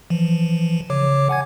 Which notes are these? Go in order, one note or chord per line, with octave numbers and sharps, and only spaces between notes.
E3 F3
C#3 C#5 D6
F#5 G#5 G#6